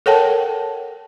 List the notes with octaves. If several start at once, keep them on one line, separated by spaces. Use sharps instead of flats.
A4 A#4 C#5 F#5 G5 A5